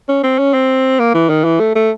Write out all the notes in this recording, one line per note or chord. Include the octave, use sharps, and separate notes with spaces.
C#4
C4
C#4
C4
A#3
E3
D#3
E3
A3
A3